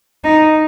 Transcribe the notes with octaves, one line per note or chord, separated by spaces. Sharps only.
D#4